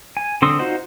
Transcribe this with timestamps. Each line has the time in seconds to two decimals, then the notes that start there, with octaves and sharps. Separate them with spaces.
0.17 G#5
0.42 D3 C4 C6 D#6 E6
0.59 D#4 F4 F#4 C5 D#5